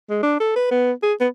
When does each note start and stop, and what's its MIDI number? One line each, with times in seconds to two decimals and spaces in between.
0.10 0.22 56
0.23 0.38 62
0.40 0.53 69
0.56 0.68 71
0.71 0.92 59
1.03 1.13 68
1.20 1.28 59